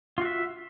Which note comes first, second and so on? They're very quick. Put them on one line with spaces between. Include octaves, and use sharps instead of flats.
F4 F#4 E5